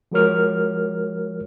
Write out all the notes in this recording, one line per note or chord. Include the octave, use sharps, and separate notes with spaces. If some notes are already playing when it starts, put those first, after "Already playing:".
F3 G#3 F#4 A#4 C#5 F6